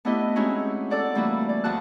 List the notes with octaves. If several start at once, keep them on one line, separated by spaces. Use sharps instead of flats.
A3 B3 D4 E4 G4 D#5
G#3 C4 C#4 D#4 E4 F#4
A4 D5 F#5
E3 G3 A3 A#3 D4 F#4
D5
D2 F3 F#4 A5 F#6